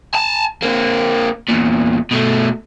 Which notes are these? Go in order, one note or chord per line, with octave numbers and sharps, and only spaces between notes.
G#5 A5
A#3 C4
E2 A#2
B2 A3